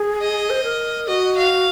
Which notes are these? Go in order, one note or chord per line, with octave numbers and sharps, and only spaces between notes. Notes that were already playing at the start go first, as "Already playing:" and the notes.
Already playing: G#4
D#5
C5
A#4
F#4 D#5
F5